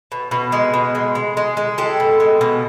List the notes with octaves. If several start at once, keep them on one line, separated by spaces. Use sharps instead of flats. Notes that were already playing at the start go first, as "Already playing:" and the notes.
B2
B2
G#3
B2
G#3
G#3
G#3
G#3
G#3 G4 A4
B2
G#3
B2